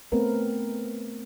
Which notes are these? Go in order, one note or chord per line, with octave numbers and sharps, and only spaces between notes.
A3 B3 C4 A#4 B4